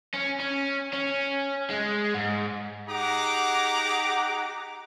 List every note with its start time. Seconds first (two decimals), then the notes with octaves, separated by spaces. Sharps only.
0.14 C#4
0.40 C#4
0.93 C#4
1.70 G#3
2.14 G#2
2.88 D#4 G4 G#4 F#5 A#5 D6